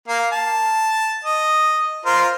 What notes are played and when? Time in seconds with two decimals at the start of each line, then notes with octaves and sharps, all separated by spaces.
0.08 A#3 F5
0.32 A5
1.24 D#5
2.06 F4 A#4 C5